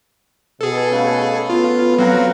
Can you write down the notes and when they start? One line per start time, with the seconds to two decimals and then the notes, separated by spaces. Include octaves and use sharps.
0.61 B2 G#4 A4
0.91 C#3 A3 B4
1.50 B3 F4
1.98 F#3 C4 F5 F#5 A#5